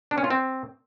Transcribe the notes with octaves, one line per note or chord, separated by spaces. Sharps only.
D4
C#4
F4
C4